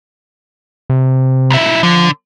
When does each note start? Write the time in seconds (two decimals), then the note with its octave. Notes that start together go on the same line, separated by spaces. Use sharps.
0.90 C3
1.50 B1 E4
1.83 D3 F3